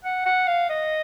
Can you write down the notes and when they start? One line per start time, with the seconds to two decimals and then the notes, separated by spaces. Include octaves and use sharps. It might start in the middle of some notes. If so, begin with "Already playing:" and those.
0.04 F#5
0.26 F#5
0.48 F5
0.70 D#5